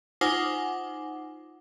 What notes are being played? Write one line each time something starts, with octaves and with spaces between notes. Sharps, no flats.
D#4 F4 C5 F#5 G#5 D6